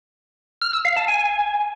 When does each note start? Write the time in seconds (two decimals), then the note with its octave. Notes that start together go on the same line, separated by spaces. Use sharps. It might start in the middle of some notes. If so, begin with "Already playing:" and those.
0.62 F6
0.73 E6
0.85 F5
0.97 A5
1.08 G#5